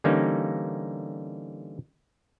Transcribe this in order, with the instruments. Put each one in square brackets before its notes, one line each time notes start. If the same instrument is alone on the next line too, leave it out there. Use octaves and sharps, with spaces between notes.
[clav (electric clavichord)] D3 E3 G3 A#3 C#4 D#4